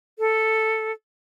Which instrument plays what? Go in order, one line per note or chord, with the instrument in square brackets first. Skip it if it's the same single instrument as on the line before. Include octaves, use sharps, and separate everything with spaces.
[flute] A4